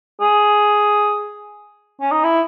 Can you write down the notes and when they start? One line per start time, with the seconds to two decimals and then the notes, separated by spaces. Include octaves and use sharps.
0.21 G#4
2.01 C#4
2.11 D#4
2.24 E4